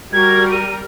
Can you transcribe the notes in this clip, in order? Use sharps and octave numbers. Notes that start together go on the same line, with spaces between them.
G3 F#4 A#4 G#6
D#7